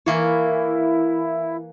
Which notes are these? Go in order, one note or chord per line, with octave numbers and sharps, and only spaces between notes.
E3 A#3 E4 C#5